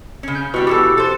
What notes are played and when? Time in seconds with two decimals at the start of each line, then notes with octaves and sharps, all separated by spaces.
0.23 C#3 C#4
0.35 G6
0.54 B2 G3 E4 F#4 G4 B4
0.67 B2 E3 G4 A4
0.98 A4 C5 A6